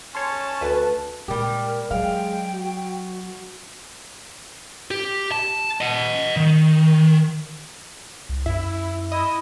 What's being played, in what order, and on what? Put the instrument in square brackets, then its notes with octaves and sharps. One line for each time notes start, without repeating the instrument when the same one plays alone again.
[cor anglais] C#4 [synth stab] C#5 C6 [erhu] A5
[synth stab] D2 [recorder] B4
[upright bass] A#2 G#3 [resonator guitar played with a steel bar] G3 G4 [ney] A#4
[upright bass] F#3 [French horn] G#3 [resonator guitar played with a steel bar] F5 [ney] G5
[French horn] F#4
[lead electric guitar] G4
A5
D#5 F#5
D#3
[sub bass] C2
[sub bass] F#2 [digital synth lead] E4
[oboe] E4 [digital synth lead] D#5